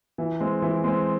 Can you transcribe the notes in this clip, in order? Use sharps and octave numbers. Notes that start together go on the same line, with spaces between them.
E3
G#3 C4
E3
G#3 C4